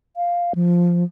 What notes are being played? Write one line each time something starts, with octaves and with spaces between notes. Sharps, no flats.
F5
F3